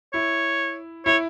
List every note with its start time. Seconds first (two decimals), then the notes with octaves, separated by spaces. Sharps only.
0.13 E4 C#5
1.06 E4 C#5